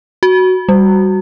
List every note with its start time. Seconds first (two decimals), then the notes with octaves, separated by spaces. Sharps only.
0.23 F#4
0.69 G3